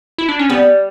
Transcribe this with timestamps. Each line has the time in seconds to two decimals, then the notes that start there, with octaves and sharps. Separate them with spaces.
0.18 E4
0.29 D4
0.39 C#4
0.50 G3 B3